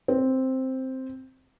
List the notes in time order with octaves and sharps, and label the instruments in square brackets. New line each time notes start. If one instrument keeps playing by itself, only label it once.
[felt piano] C4